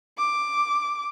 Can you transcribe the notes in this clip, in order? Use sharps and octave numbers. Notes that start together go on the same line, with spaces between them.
D6